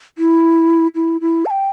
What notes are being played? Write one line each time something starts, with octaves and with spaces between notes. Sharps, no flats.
E4
E4
E4
A5
G5